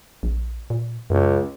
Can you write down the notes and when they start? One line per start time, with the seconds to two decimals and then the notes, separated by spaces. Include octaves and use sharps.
0.23 A#1
0.70 A#2
1.10 C#2 F#2